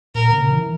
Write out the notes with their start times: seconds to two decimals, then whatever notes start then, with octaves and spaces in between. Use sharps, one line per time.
0.15 A#2 A#4
0.33 C#3
0.51 E3